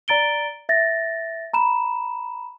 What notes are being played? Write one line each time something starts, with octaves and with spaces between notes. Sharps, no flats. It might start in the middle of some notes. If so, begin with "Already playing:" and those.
D5 A#5 A6 D7 G7
E5 A6 A#6
A#5 B5 E7